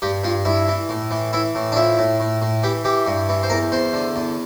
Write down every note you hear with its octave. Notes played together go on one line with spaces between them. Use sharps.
G2 G4
G2 F4
G2 E4
E3
A2
E3
E3 E4
A2
D4
F3 E4
A2
A2
A2
E3 G4
E3 G4
G2
E3
C5
E2 A#4
E2 C5
D3
E2